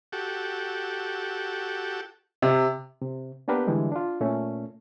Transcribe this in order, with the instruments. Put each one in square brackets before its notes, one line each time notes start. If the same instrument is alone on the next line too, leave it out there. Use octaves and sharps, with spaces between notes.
[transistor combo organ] F#4 G4 A4
[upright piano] C3
[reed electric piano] C3
A#3 B3 D4 G4 A#4 B4
D3 E3 G3 G#3
D4 F4
A#2 A3 C#4